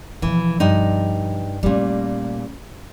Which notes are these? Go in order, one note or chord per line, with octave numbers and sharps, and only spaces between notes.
B2 E3 F3
G2 D#4
A#2 G3 A3 C#4